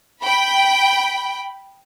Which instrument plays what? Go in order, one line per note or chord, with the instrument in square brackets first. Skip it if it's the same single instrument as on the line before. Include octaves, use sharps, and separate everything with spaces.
[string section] G5 B5